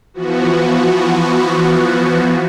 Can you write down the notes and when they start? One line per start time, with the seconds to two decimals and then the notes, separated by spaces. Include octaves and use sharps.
0.14 E3 F3 B3 F#4